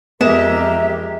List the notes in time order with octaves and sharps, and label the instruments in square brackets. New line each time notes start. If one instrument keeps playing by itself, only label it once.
[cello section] F2 G4 [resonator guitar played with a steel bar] G#3 [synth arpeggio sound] B3 E7 [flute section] A#4 E5